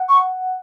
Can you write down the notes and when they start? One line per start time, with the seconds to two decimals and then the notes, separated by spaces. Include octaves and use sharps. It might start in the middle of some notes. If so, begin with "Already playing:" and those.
Already playing: F#5
0.09 C#6